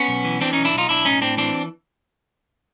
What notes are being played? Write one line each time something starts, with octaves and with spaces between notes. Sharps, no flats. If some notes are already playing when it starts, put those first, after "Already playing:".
Already playing: B3 C#4
B1
E3
E3 C4 D4
B1 C#4 D#4
D4 E4
B1 D#4 F4
B1 D4 E4
A2 C#4 D#4
A2 C4 D4
E3 C4 D4